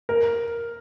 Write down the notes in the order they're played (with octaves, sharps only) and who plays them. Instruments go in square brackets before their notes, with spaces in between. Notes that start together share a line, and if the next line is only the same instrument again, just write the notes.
[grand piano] A#4